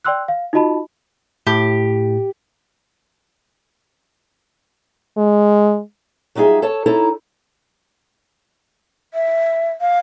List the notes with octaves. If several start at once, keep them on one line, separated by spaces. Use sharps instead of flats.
D5 G5 C6 E6 F#6
F5
D#4 F4 F#4 D#5 A5 B5
A2 G4
G#3
F#3 G3 D#4 F4 G#4 E5
A4 C#5 A5
D#4 E4 A4 C#5 A#5
E5
F5